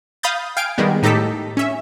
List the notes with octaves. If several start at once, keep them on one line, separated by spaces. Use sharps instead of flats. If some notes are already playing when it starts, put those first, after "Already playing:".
F5 B5 D#6 G6 A6
F5 G5 G#5 G#6 D7
D#3 G3 G#3 B3
A2 D#4 G4 A4 B6
C#4 E5